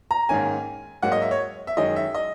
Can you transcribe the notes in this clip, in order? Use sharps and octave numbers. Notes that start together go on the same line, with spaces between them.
A#5
G#2 D#3 A#3 C#4 G#5
G#2 F#3 A#3 F#5
D#5
E5
C#5
E5
F#2 D#3 G#3 C#4 D#5
E5
D#5